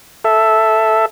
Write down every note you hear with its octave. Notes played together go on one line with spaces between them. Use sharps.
A4 E5